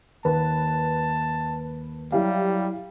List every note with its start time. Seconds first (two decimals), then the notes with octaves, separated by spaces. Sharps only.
0.25 D#2 B4 A5
2.12 F#3 G3 E4 G4 F5